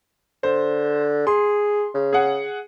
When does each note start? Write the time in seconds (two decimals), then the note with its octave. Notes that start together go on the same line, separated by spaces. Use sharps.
0.43 D3 C5
1.27 G#4 C6
1.94 C#3
2.13 G#4 F#5